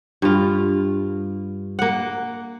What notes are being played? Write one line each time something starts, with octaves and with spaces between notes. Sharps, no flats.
G2 F4
A#3 F#5